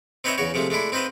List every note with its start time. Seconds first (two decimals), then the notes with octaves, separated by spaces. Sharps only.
0.24 C4 D#4 B4 C#5 D#5 E5
0.38 E2 C#3 F#4 C#5
0.54 C3 F3 G#3 A3
0.70 G#3 A3 D4 E4
0.92 C4 D#4 F4 B4 C5